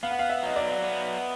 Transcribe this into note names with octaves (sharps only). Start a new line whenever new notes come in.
B3 F5
F#5
F5
E5
F#3 D#5
D5
B3